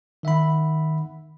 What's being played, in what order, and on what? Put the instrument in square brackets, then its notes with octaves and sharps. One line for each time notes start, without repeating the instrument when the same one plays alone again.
[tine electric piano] D#3 E5 F#5 B5